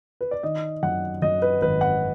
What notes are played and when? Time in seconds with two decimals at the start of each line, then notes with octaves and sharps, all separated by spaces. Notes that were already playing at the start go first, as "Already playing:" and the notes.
0.21 B4
0.31 D5
0.43 D#3 D#5
0.83 F#2 F#5
1.22 F#2 D#5
1.42 B4
1.61 G#1 B4
1.81 F#5